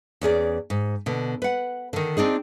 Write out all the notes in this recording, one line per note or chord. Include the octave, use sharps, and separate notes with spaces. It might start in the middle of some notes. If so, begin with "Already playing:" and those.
E2 C#4 G#4 D5
G#2
B2 D3
B4 F#5
D3 D#3
C4 D4 D#4 G#4